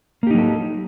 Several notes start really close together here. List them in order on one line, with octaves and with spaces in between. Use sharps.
A#3 G4 D#4 F#3 A4